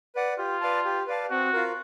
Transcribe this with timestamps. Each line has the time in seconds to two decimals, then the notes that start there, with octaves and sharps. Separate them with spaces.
0.15 B4 D5 F#5
0.38 F4 G4
0.61 B4 D5 F5 A5
0.85 G4
1.07 B4 D5 F5 A5
1.31 C4 F#4
1.53 F4 A#4